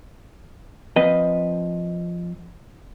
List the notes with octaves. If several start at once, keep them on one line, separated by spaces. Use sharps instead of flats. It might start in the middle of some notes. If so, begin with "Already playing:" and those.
F3 C4 B4 D#5